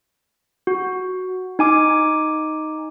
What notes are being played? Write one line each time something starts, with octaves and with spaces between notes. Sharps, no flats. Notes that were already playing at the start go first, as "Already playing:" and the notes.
F#4
D#4 G#5 D6